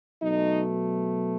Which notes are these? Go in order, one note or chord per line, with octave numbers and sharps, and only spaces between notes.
B2 F#3 A3 D#4